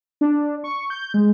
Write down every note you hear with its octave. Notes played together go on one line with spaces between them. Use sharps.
D4
C#6
G6
G#3